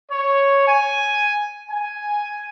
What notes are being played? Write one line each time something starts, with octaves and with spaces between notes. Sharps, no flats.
C#5
G#5
G#5